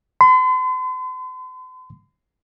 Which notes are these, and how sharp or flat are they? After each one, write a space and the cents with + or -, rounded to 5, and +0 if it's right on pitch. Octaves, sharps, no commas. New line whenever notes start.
C6 -45